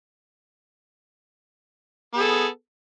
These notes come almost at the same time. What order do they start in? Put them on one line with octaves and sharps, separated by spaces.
B3 G#4 A4